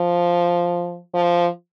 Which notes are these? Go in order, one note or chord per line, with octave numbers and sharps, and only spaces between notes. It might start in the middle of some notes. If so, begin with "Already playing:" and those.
Already playing: F3
F3